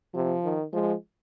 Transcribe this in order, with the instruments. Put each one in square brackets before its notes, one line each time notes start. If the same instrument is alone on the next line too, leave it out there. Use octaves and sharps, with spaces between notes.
[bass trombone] C3 [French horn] F3
[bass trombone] D#3
[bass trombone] F3 [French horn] G#3